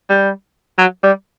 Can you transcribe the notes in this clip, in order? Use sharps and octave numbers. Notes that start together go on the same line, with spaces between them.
G3
F#3
G3